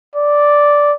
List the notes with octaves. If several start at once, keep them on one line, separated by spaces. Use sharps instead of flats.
D5